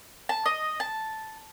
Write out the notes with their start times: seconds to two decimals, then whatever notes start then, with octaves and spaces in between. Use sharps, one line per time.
0.29 A5
0.46 D#5
0.80 A5